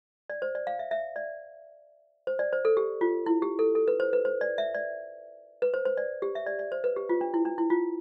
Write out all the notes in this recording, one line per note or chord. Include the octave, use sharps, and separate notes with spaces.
D5
C5
D5
F5
E5
E5
D5
C5
D5
C5
A4
G4
F4
E4
G4
A4
A4
B4
C5
B4
C5
D5
E5
D5
B4
C5
C5
D5
G4
E5
D5
D5
C5
B4
G4
F4
D4
E4
D4
E4
F4